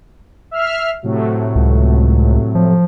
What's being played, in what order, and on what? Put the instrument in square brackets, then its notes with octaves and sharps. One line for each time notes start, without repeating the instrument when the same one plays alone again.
[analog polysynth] E5 F6 C7
A2 C3 F#3
[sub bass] C#2
F3